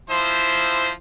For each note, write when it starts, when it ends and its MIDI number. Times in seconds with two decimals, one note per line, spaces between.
0.10 0.90 53
0.10 0.90 64
0.10 0.90 72